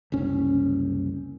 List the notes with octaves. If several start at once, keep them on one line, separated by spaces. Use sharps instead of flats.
F#1 C2 C#4